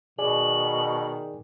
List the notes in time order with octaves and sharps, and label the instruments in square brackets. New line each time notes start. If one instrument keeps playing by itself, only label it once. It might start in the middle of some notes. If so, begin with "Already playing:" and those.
[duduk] B2 [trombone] D#3 [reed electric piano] G#4 D5 G#5 [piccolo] F#7